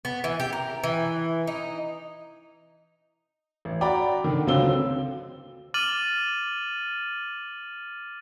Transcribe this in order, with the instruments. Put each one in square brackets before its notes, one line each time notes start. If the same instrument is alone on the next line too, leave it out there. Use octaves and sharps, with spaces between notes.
[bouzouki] B3
E3
G4
A#4
E3
D#4
[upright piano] A1
F#4 D5 G5 A#5 B5 D6
D3 D#3
C#2 D3 F#3 C4 E6 G7
[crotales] D6 F6 A6 D#7 F#7